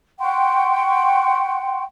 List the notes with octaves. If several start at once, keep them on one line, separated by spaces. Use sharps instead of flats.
F#5 G5 C6 C#6